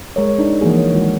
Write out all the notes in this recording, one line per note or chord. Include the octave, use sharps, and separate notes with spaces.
G#3 A#4 C#5
D4 D#4
E3 F3 A#3 F#4 G#4
C#5
D#3 G#3 F#4